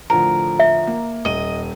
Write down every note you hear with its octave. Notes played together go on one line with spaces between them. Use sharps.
A2 D3 F3 A#4
E5
A#3
D#1 D#5 D#7